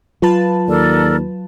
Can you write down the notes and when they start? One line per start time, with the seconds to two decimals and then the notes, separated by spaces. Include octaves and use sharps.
0.22 F#3 F4 B4 A5
0.67 D#2 A4 A#4 D5